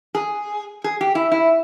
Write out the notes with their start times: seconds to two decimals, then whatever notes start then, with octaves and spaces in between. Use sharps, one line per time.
0.15 G#4
0.84 G#4
1.01 G4
1.15 E4
1.32 E4